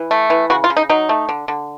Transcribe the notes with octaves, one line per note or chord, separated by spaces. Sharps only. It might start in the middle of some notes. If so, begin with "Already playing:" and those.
Already playing: E3
A3
E3
C#3 F#4
F4
C#3
D#4
F#3 D#4
A3
D3
D3